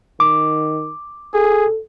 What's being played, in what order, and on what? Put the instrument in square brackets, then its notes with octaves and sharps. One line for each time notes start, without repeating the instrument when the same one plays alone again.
[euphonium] D#3 [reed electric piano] D6
[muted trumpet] G#4 [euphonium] A4